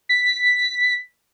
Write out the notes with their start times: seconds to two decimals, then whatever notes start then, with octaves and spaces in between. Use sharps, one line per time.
0.09 B6